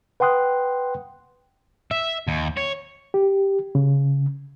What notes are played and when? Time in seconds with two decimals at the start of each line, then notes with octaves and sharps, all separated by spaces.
0.20 B4 F#5 G5 C6 D#6 F#6
1.91 E5
2.28 D#2
2.57 C#5
3.14 G4
3.75 C#3